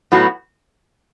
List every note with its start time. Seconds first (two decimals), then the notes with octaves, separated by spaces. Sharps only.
0.12 A2 F#3 B3 F#4